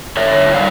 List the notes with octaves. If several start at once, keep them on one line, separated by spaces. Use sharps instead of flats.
D3 C#5 E5
G3 D5 F5